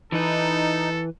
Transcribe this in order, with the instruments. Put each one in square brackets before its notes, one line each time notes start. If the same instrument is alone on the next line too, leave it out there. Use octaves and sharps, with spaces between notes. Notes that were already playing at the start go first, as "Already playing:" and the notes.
[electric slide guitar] E3 B4 [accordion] D#4 [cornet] A4